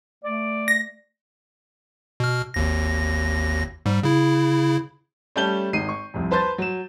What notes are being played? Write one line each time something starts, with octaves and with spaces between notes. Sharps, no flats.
A3 D5
A#6
B2 F6
G#1 D#2 A#6
G#2 G3
C#3 E4
G3 A3 C#4 A5 G6 G7
G#1 D#4 C7 D#7
C#6
C2 F2
B4 C5 A5 C6 G6 A6
F#3 E7